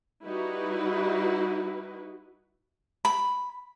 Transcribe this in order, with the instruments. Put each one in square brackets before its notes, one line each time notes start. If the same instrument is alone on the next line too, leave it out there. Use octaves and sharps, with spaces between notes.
[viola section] G3 D#4 E4 F#4 B4
[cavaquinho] B5